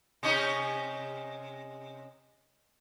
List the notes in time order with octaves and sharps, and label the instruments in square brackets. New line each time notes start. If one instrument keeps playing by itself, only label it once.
[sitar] C3 C#4 D#4